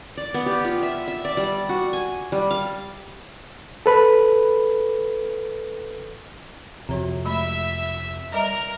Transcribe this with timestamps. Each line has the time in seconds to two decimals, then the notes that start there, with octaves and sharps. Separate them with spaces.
0.17 D5
0.34 B3
0.46 G4
0.65 F4
0.83 E5
1.08 E5
1.25 D5
1.37 G3
1.69 F#4
1.93 G#5
2.32 G3
2.51 F5
3.86 A4 B4 B5
6.89 F2 C3 F#4 C#5 A#5
7.25 G#3 A3 E5 B5
8.32 G3 A#4 D#5 E5